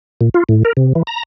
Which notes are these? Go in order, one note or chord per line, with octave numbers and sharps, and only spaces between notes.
A#2
F4
A2
A#4
C3
E3
A#5